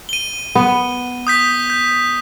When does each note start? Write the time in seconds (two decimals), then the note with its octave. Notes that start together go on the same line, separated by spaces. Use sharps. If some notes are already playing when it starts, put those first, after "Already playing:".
0.09 D#7 G7
0.55 B3
1.27 D#6 G6 B6
1.70 G6